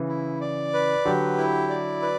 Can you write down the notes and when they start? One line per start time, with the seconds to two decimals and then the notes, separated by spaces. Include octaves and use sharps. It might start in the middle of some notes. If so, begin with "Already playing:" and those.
Already playing: C#3 E3
0.08 E4
0.41 D5
0.74 B4
1.05 D3 F#3 G4
1.38 E4
1.69 D5
2.02 B4